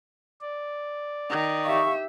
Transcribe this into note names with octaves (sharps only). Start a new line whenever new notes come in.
D5
D#3
G4 E5 F5 C#6